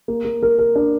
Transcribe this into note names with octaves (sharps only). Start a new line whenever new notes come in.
A#3
A#3
A#4
A#4
D4